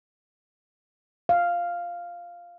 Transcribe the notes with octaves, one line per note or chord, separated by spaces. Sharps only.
F5